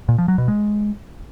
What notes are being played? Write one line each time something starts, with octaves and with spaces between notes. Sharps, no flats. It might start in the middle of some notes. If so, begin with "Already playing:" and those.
A#2
F3
F#3
B2
G#3